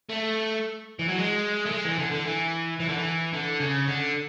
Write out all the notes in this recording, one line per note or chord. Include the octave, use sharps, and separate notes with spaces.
A3
E3
F#3
G#3
A3
G#3
E3
D3
D3
E3
E3
D3
E3
D3
C#3
D3